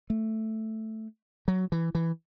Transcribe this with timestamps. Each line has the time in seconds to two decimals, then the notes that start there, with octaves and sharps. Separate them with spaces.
0.10 A3
1.48 F#3
1.72 E3
1.95 E3